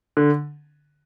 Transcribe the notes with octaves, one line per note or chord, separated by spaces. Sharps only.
D3